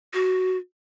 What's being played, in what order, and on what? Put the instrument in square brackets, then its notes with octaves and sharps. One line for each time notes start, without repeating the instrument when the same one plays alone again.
[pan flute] F#4